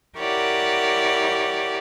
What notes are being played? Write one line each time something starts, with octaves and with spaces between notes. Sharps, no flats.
E4 G4 A#4 C#5 D5 F#5